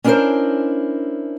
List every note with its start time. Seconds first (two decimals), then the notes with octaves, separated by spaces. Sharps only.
0.04 C#4 D4 E4 G4 A#4 C5